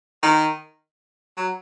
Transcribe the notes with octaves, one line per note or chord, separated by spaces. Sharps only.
D#3
F#3